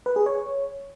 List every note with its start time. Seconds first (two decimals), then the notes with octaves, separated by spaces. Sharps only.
0.06 B4
0.16 G#4
0.26 C#5